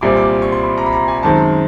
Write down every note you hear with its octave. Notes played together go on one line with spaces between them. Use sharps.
C2 A#2 G3 C4 D6
D6
C#6
C6
B5
A#5
B5
A#5
G#5
F#2 D#3 G#3 C4 A5